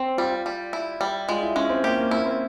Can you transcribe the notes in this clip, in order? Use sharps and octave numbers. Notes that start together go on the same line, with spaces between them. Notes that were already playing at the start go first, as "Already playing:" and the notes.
Already playing: C4
G3 F4
G3
E4
G3
G#3 F4
E4
G#3 C#4
C4
A#3 G4
A#3
A#3 E4
C4